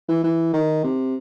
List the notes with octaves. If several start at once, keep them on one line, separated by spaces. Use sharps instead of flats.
E3
E3
D#3
C3